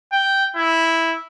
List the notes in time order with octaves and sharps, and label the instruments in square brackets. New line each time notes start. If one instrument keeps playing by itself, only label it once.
[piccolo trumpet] G5
E4